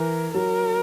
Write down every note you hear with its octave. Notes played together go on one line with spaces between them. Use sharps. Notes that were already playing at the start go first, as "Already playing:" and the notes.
Already playing: E3 A#4
F#3 A#4